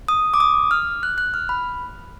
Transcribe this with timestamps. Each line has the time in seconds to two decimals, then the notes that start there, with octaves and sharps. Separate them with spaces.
0.08 D#6
0.34 D6
0.40 D#6
0.71 F6
1.03 F#6
1.18 F#6
1.34 F6
1.49 B5